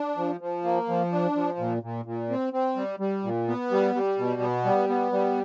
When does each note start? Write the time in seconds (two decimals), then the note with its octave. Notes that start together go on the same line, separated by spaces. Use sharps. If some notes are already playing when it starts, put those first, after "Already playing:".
Already playing: D4
0.17 F3
0.41 F3
0.64 A#3
0.88 F3
1.12 D4
1.35 F3
1.59 A#2
1.83 A#2
2.05 A#2
2.30 C4
2.53 C4
2.76 G3
3.00 G3
3.24 A#2
3.48 B3
3.71 G3
3.95 G3
4.18 B2
4.42 B3
4.65 G3
4.89 B3
5.12 G3